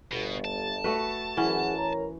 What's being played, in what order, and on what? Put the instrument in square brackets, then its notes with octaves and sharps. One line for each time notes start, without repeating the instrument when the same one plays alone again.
[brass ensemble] G1 [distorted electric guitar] B2
[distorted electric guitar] A5
[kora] A3 F#4 B4
[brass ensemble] F#2 G#4 F#5 [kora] E3 C#4
[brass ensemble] A#4 C#5 A#5